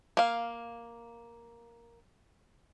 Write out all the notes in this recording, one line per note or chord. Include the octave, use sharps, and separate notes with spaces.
A#3 F5